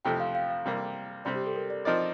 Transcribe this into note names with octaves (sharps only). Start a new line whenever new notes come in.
F2 C3 F3 A3 G5
F5
F5
F5
C3 G3 A#3
C3 G3 C4 D5
G4
A4
A#4
D5
F3 C4 D#4 A#4 D5 D#5